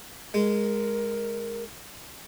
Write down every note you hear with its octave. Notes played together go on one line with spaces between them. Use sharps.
G#3 A#4